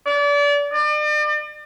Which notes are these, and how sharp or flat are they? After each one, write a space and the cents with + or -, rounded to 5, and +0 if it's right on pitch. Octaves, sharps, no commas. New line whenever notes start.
D5 -35
D5 +40